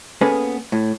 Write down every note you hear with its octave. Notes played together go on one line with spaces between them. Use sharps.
A#3 B3 C#4 G#4 A4 B4
A2